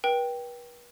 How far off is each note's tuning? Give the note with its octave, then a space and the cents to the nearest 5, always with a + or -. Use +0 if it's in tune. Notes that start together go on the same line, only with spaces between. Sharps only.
B4 -40 G5 +0